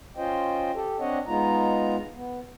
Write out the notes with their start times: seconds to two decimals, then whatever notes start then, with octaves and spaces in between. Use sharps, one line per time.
0.17 C#4 F4 C5 D#5 G5
0.75 G4 A4
1.00 C4 D4 C#5 D#5 F#5
1.27 G#3 B3 D#4 F4 A#5
2.15 B3